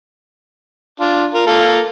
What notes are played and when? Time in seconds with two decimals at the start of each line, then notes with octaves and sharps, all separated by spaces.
1.00 D4 F4
1.34 F4 A#4
1.46 A#3 F4 A4